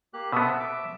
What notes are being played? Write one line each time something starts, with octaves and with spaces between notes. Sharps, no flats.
A#3 G4 F#6
B2 B3 C4 A4 E5 D#6
D6